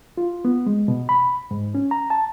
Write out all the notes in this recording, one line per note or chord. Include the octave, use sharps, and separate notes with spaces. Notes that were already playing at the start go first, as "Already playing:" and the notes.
F4
B3
G#3
B2
B5
G#2
C#4
A#5
A5